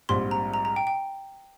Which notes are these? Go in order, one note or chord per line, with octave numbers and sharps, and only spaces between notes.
A#1 G#2 G3 C4 C6
A#5
A#5
A#5
G5
G5